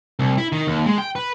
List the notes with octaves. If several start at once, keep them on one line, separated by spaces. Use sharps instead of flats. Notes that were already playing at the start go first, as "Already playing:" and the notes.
C2
E4
D#3
D#2
G#3
G5
B4